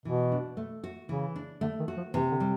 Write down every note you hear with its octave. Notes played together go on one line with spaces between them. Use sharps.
B2 E3
D4
A3
F#4
C#3 E3
D4
D3 A3
D#3
F#4
F3
C3 E3
D3
G3